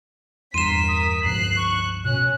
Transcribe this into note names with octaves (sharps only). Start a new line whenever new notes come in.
E2 G2 A#4 C6 B6 D#7 E7
D#6
C#2 G2 F3 F#6 C7
C#6
B2 C#4 F#6